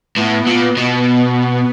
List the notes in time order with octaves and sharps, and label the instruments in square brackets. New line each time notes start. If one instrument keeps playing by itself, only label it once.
[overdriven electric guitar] A2 [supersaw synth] B3
[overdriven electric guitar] A#2
B2